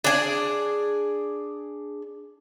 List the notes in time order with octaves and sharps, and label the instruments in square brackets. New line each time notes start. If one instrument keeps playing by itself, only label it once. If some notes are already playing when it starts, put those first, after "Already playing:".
[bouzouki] D4 G#4 D5